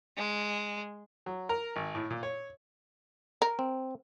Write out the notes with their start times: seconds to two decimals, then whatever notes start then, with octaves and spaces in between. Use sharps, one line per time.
0.17 G#3
1.26 F#3
1.49 A#4
1.76 G#1
1.95 A2
2.10 A#2
2.23 C#5
3.42 A#4
3.59 C4